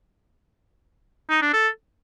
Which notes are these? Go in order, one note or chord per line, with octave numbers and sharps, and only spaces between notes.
D#4
D4
A4